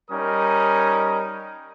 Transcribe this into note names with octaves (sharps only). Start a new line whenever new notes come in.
G3 C#4 D#4 A#4 D#6